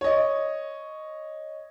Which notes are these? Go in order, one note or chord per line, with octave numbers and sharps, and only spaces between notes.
C#5 D#5